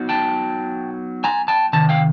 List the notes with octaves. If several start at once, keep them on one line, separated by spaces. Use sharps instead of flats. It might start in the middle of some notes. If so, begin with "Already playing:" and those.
Already playing: F#3 B3 D#4
G5 A5
G#5 A#5
G5 A5
C3 D#3 A5
F5 G5